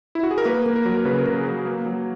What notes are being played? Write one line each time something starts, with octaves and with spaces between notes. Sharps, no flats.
E4
F#4
G#4
A#4
A#3 B4
A#3
A#4
F#3
A#4
C#3 B4
A#4
C#3
G#4
F#3 F#4
A#3
F#3